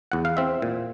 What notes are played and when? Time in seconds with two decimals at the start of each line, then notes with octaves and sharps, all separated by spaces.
0.12 E2 F#5
0.25 F5
0.37 C4 E5
0.62 A#2